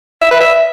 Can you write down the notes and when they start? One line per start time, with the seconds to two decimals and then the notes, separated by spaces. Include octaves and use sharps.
0.22 E5
0.31 B4
0.40 E5